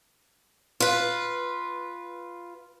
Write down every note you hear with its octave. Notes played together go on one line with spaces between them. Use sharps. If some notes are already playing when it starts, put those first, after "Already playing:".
F4 B4